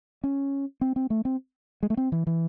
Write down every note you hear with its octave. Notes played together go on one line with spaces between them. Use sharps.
C#4
C4
C4
A3
C4
G#3
A3
C4
E3
E3